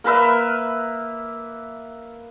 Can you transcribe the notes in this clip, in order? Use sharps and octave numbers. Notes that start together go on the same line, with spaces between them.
A#3 A#4 B4 E5